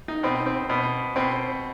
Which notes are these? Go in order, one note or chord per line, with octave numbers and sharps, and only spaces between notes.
D#4
B2 C4
C4
B2
B2 C4